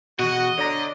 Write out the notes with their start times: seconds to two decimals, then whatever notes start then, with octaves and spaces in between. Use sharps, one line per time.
0.19 E2 B2 F#4 D#5
0.58 D3 C#5 D5 A#5